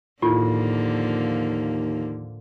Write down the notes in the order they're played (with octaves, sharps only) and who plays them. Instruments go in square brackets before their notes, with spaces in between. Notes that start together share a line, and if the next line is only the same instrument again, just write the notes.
[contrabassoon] D#2 [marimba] A2 [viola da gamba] D3 F3 A#3 [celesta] E4 F4